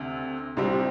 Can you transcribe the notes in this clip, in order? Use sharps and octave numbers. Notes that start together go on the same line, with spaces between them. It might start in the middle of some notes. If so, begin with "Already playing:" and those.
Already playing: D2 C3
C2 C3 G3 C4